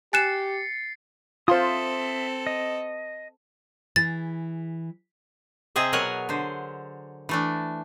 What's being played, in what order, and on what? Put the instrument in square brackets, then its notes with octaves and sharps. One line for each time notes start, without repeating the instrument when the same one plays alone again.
[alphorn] G4 [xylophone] G#5 F#6 E7 [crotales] A6 C7 C#7
[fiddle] C4 A4 [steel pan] F4 C5 [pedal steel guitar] E5 C6 D#6
[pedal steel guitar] D#5
[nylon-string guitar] E3 G#4 [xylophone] A6
[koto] C3 C4 G#4 D#5 E5
B2 F#3 A#4 F#5 G#5
D3 C5
E3 A3 D4